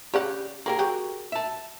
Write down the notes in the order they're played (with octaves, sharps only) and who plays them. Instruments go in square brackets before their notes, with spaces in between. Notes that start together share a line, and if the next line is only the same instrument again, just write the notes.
[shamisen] C#3 D5 F#5 [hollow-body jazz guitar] G4
[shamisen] A#3 G4 [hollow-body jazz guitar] G#4 A#4
[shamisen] F#3 F#4 G4
[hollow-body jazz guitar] E5 A5